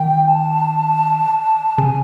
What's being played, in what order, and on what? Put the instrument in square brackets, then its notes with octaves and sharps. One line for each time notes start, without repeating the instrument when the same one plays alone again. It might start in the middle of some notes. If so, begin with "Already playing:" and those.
Already playing: [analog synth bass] D#3 [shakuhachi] G5
[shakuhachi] A5
[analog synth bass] C#3 [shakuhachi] G#5